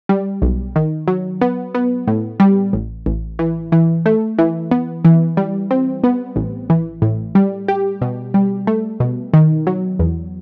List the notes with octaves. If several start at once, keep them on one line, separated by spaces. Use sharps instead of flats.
G3
B1
D#3
F#3
B3
B3
A2
G3
A1
A1
E3
E3
A3
E3
B3
E3
G3
C4
B3
A1
E3
A2
G3
G4
B2
G3
A3
B2
D#3
F#3
E2